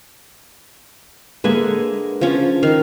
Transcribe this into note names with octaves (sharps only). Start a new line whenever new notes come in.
D3 G#3 A#3 B4 E5 G#5
F3 C#4
D#3 F5